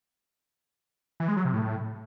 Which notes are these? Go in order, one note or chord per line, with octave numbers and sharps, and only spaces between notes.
E3
G#3
F#3
C3
A2